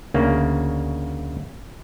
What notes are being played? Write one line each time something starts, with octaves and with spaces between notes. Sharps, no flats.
D2 C#3 A#3